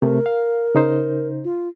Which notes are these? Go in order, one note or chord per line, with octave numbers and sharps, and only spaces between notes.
C3 A3 A#4
F5
C#3 D#4 C5
F4